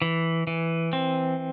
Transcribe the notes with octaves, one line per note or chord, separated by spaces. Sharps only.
E3
E3
C4